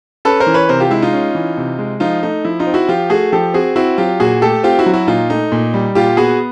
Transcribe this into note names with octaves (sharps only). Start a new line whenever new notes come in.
C#4 A4 B4
A#4 C5
E3
B4 C#5
C3 A#4 C5
F4 G4
G#3 E4
D#4 F4
C#4
E3
C3
G#3
F3 D#4 F4
A3 D#4
F3 E4
D#4 F4
C4
E4 F#4
F3 F4 G4
A3 F#4 G#4
F3 G4 A4
C4 F#4 G#4
C4 E4 F#4
F#3 F4 G4
A#2 F#4 G#4
A3 G4 A4
C4 F4 G4
E4 F#4
F#3
E4 F#4
A#2 D#4 F4
A3 D#4
A#2
G3
A#2 F4 G4
B3 F#4 G#4